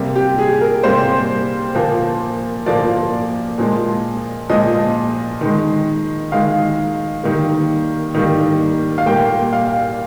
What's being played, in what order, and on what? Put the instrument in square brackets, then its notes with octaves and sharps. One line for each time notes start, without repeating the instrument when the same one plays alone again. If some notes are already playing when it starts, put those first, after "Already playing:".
Already playing: [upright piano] C3 G3 A#3
G4
G#4
A#4
C3 G3 A#3 C5
A#2 F3 A#3
A#2 F3 A#3 D5
A#2 F3 G#3
A#2 F3 G#3 D#5
D#3 G#3
D#3 G#3 F5
D#3 G3 A#3
D#3 G3 A#3
F5
A#2 G3 A#3 G5
F5